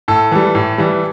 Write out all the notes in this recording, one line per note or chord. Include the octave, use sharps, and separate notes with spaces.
A2 A4
E3 G3
A2
E3 G3